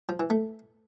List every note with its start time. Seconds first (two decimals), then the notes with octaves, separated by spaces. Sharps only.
0.09 F3
0.20 E3
0.30 A3